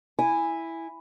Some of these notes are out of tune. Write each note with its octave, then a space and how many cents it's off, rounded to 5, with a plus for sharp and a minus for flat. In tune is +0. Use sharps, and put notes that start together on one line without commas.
E4 +0 G#5 -10